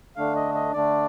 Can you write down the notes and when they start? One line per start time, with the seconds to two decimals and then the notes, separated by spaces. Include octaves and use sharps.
0.16 D3 A3 D4 F5
0.35 D#5
0.55 D#5
0.73 D3 A3 D4 D5